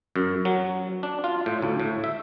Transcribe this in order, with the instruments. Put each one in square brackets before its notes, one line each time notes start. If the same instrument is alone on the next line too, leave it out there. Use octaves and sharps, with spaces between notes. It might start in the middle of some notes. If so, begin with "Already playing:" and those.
[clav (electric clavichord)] F#2
F#3
D4
F4
A2
D2
A2
E5